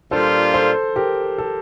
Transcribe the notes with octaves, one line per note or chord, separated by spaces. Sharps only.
A#2 G3 D4 F4 A4 C5
A4 C5
G4 A#4
A4